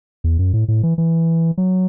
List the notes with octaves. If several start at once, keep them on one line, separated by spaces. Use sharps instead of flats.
E2
F#2
A2
A2
E3
E3
F#3